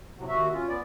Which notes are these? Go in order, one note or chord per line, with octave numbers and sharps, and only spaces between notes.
A2 C3 F#3
D#2 F#4 E5
C#4 F4
B3 D5